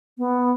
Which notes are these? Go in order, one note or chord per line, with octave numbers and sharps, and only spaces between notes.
B3